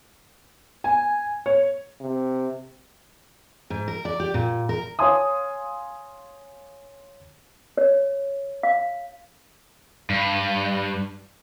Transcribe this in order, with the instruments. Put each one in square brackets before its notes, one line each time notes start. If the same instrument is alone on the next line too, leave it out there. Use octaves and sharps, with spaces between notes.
[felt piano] G#5
C#5
[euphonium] C3
[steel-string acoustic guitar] G#2
A#4
D5
G4
A#2
A#4
[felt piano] C#5 F5 G#5 C6 D#6
[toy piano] C#5
F5
[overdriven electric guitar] G2